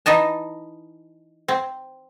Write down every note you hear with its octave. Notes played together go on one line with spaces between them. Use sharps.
E3 D#4 D#5 A5
C4